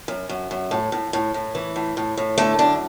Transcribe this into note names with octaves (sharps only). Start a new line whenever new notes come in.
F#2
F#2
F#2
A2
A2
A2
A2
E3
A2
A2
A2
D3 A3
F#2 D4